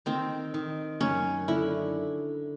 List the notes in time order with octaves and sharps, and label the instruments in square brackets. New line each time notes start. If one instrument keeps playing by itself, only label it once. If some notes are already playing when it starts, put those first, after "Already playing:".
[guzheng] D#3 [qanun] C4
[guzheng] D#3
[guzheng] F#2 [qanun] C#4
[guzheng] D3 [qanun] E4